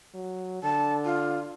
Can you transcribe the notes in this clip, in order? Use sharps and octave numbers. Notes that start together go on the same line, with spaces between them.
F#3
D3 A5
F4